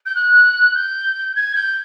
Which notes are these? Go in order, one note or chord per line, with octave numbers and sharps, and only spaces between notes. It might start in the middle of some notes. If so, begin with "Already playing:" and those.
G6
F#6
G6
G#6
G6